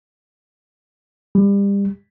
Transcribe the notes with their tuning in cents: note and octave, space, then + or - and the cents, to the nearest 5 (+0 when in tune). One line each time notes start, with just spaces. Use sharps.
G3 +30